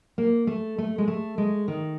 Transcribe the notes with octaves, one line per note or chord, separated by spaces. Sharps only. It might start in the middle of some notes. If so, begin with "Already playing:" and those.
A#3
A3
A3
G#3
A3
G#3
D#3